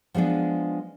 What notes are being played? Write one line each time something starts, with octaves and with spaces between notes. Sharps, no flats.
F3 G#3 B3 D4